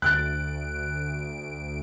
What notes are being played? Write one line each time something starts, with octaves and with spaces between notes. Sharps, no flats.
D2 F#6 A6 D7